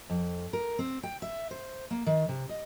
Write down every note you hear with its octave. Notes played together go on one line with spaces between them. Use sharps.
F2
A#4
C4
G5
E5
C5
A#3
D#3
C3
D#5